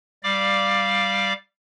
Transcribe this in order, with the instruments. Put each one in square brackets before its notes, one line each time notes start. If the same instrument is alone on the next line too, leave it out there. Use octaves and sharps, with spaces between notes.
[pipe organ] G3 D5 F5 D6